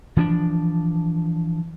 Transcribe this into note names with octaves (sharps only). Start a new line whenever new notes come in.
E3 F3 C4 D4